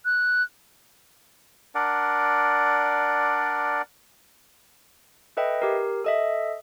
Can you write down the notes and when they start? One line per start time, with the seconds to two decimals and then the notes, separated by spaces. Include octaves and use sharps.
0.05 F#6
1.75 D4 A#4 D5 F#5
5.37 A4 B4 D#5 E5 G5
5.62 G4 A#4
6.04 A4 D#5 E5